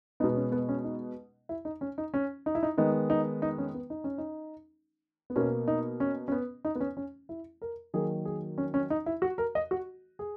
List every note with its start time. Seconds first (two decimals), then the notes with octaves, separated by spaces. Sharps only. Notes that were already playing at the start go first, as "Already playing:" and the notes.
0.20 B2 G#3 B3 D#4
0.36 C#4
0.52 B3
0.69 C#4
0.84 D#4
1.49 E4
1.65 D#4
1.81 C#4
1.98 D#4
2.14 C#4
2.46 D#4
2.55 E4
2.63 D#4
2.77 D#3 G#3 B3 D#4
3.10 D#4
3.42 D#4
3.58 C#4
3.74 B3
3.90 D#4
4.04 C#4
4.18 D#4
5.30 B3
5.36 B2 A#3 C#4
5.68 D#4
6.00 C#4
6.28 C#4
6.32 B3
6.65 D#4
6.75 B3
6.80 C#4
6.97 C#4
7.29 E4
7.62 A#4
7.94 D#3 F#3 A#3 G#4
8.25 G#4
8.58 C#4
8.74 C#4
8.90 D#4
9.06 E4
9.22 F#4
9.38 A#4
9.55 D#5
9.71 F#4
10.19 G#4